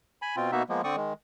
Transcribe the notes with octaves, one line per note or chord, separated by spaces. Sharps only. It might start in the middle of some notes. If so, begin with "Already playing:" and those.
G#5 B5
B2 C4 F4
B2 A#3 B3 D#4 F#4 E5
F3 G#3 A#3 B3
D3 C4 D5 C#6 D#6
D#3 G#3